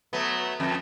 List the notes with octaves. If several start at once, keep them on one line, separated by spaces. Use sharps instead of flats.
F#3 A3 B3
F2 A3